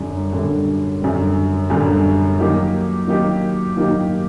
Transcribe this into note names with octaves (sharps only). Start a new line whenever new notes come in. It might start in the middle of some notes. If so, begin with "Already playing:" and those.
Already playing: F#2 D3 G3
F#2 D3 G3
F#2 D3 G3
F#2 D3 G3
D#3 F#3 A#3 D#4 G4
D#3 F#3 A#3 D#4 G4
D#3 F#3 A#3 D#4 G4